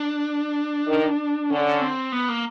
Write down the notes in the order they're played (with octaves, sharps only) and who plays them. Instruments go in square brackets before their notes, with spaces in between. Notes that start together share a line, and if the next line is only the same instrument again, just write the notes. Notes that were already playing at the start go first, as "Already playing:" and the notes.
Already playing: [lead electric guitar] D4
[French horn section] D#3
[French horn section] D3 [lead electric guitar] C#4
[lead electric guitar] C4
B3
A#3